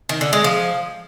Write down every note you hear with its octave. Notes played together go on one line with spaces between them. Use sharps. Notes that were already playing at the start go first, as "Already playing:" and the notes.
D#3
D3
G#3
F3